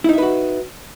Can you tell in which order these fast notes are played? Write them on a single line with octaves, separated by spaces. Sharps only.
E4 D#4 E5 B4 F#4